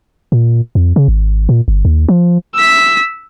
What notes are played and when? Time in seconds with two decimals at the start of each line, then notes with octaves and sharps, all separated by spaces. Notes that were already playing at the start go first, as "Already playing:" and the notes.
0.32 A#2
0.75 F2
0.96 C#3
1.08 G#1
1.49 A#2
1.68 G1
1.85 D#2
2.08 F3
2.55 E6 B6